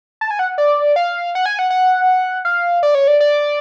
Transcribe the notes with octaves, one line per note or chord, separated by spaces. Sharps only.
A5
G#5
F#5
D5
F5
F#5
G#5
F#5
F#5
F5
D5
C#5
D5
D5